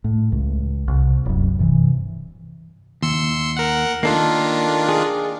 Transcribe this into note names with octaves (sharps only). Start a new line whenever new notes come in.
A2
C#2
C2
D1 C2 F#2
G2 C3 E3
D#2 C6 E6 C#7
A#4 F#5
D#3 A#3 D4 F4 A4
G#4